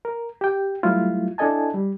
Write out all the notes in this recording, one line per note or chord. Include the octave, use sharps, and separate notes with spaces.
A#4
G4 G5
F#3 G3 A3 E4 F4
D4 E4 A4 D#5 G#5 A5
G3